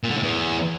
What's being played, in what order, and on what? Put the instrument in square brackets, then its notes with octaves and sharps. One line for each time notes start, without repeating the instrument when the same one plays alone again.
[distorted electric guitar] A#2
D3
A2
E2